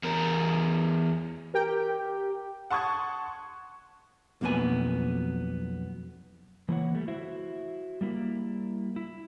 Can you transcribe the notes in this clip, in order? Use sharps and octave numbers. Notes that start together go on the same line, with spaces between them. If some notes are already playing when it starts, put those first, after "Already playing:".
E2 A#4
G4 A#4 G5
F#5 A5 C6 C#6 D#6 G#6
B1 F2 B2 A#3 B3 G#5
E3 A#3 E4 B4 C#5 F#5
E3 G3 A3
E4 F#4 C5 E5
G3 A#3 E4
E4